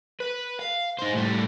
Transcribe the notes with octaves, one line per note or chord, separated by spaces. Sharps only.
B4
F5
D#4 C5
A2 G3